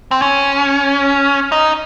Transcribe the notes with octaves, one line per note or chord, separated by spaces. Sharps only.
C4
C#4
D#4